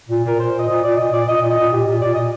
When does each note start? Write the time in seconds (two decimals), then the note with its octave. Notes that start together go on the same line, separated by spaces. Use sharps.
0.08 A#2
0.23 A#2 A#4
0.37 A#2 C5
0.52 A#2
0.59 D#5
0.68 A#2
0.82 A#2 D5
0.96 A#2 D#5
1.11 A#2 D5
1.26 A#2 D#5
1.41 A#2
1.48 D#5
1.56 A#2
1.70 A#2 G4
1.85 A#2
2.01 A#2 D5
2.15 A#2 D#5